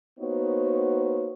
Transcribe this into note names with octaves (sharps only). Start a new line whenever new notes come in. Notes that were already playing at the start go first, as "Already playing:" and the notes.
A#3 B3 D#4 F#4 C5 C#5